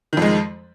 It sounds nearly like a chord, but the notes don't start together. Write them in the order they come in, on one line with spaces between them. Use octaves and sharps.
D#3 F2 G#3